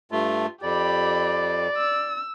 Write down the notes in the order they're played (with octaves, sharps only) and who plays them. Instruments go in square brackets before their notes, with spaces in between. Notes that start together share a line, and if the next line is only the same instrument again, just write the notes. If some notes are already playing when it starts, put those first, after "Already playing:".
[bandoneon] G2 A3 [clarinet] F4
[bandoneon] F2 [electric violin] G4 B5 [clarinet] D5
[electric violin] E6